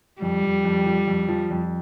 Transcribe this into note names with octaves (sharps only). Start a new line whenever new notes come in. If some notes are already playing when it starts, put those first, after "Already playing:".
F2 G3
F2
F2
F3
F2
F3
F2